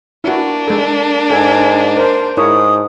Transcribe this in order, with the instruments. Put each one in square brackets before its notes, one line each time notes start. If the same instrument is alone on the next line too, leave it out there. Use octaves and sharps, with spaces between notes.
[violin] A#3 D4 [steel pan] E4 F#4
[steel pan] G#3 A4
[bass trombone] G#2 [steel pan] A4 [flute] G#5
[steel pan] A#4 [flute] C5
[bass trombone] G#2 [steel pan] E4 A#4 C#5 [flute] D#6